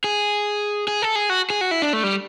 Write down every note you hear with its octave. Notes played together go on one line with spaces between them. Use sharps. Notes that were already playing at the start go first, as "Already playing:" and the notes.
G#4
G#4
A4
G#4
F#4
G#4
F#4
E4
D4
A3
G3